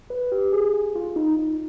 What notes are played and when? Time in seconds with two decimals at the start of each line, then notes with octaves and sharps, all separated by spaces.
0.10 B4
0.32 G4
0.52 G#4
0.74 G#4
0.95 F4
1.16 D#4
1.38 D#4